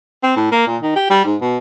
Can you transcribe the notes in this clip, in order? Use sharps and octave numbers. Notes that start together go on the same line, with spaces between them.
C4
A2
A#3
A#2
D#3
G4
G3
G#2
B2